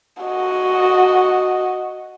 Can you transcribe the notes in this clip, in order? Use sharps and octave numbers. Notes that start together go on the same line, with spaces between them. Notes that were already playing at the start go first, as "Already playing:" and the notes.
F#4 D#5